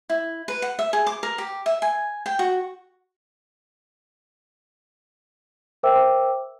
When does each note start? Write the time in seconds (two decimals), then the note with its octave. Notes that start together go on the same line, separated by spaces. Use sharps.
0.10 E4
0.48 B4
0.62 F#5
0.79 E5
0.93 G#4
1.07 D6
1.23 A#4
1.38 G4
1.66 E5
1.82 G#5
2.26 G5
2.39 F#4
5.83 A#4 C5 E5 G5 D6 E6